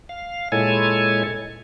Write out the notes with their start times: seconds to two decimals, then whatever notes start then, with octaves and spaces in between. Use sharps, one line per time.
0.09 F5
0.52 A#2 G#3 E4 A4 C#5 G#5